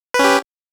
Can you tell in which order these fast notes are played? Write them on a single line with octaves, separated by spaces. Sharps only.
B4 C#4 G4